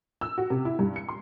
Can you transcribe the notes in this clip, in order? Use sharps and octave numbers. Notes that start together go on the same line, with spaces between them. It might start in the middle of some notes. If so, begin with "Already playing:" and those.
E6
F#4
C3
E4
G2
C#7
C6